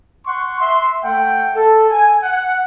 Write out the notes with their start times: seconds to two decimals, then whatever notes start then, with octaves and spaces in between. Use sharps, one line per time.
0.25 F#5 C6 C#6
0.60 E5 C6
1.03 A3 F#5 G5
1.54 A4
1.91 G#5
2.23 F#5